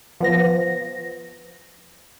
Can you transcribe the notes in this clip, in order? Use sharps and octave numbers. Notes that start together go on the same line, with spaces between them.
F3 B3 A#6